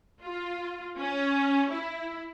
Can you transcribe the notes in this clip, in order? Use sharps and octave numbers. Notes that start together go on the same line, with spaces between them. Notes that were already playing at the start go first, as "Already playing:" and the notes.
F4
C#4
E4